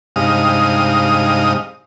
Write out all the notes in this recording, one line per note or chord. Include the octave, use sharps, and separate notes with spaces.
G2 C3 G#3 D#4 F5 D#6